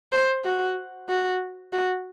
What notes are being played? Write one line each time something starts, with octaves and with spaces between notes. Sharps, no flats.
C5
F#4
F#4
F#4